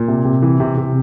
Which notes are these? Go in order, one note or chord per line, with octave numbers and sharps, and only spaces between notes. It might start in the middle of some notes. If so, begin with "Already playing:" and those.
Already playing: A#2
C3
C3
E3
C3
C3